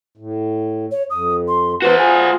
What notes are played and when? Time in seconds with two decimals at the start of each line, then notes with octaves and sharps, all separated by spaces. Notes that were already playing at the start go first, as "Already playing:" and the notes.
0.17 A2
0.92 C#5
1.10 F2 D#6
1.48 C6
1.82 E3 B3 F#4 B4 C5
1.98 F4 G#4 G#5